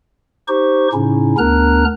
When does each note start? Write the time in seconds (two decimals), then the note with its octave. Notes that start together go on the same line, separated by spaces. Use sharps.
0.48 D#4 G4 C5 C#6
0.93 A2 C#3 C#4 D#4 E4
1.38 D2 B3 D4 A#4 A#5 F#6